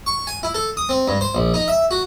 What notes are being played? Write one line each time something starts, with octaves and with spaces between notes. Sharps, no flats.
C#6
G#5
E4
A4
D#6
C4
G2
C5
A#1
D#4
E5
F#4